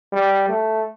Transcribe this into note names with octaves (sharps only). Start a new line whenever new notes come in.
G3
A3